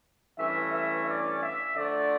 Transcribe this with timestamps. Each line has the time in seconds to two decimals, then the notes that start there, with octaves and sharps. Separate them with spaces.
0.38 G2 E3 A3 C#4 E5
0.73 E5
1.08 D5
1.42 E5
1.76 D3 F3 A3 D5